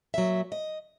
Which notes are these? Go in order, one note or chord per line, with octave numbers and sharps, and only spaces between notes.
A#2 F#3 E5
D#5